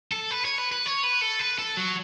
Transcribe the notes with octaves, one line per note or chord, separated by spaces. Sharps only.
A4
B4
C#5
B4
B4
C#5
B4
A4
B4
A4
F#3